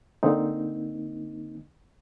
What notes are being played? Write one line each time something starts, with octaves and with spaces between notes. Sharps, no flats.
D3 A#3 C4 D#4